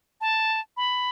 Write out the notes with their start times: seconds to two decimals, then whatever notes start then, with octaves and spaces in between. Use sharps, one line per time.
0.21 A5
0.77 B5